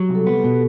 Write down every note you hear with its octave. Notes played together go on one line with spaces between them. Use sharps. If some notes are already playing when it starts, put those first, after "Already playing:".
Already playing: F#3 G4
C2
A4
B3
G4
B2